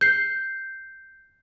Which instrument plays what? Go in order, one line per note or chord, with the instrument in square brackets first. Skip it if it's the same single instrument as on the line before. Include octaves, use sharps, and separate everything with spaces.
[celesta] G6 C7